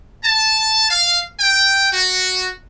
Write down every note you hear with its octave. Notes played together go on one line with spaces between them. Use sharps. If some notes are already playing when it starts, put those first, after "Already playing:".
A5
F5
G5
F#4